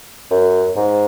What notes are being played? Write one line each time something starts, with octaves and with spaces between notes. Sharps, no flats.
F#2
G#2